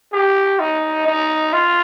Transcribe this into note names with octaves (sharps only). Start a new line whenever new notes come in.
G4
D#4
D#4
F4